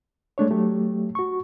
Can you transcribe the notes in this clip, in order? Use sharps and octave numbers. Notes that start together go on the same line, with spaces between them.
G#3 A3 D4 C#5
F#3 A3 G4
F#4 C#6